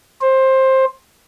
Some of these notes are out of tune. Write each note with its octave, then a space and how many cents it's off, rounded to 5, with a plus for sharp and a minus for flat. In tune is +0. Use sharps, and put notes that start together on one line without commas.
C5 +15